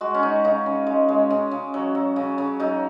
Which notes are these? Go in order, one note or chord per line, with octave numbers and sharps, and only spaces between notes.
G#3 F#4
C#4
G#3 D#4
C#3 D#4
C#3
G#3
G#3
C#3
C#3
F#3
F#3
C#3
C#3
F#3 D#4